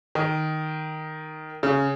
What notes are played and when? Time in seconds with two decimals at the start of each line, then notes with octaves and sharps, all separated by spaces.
0.15 D#3
1.63 C#3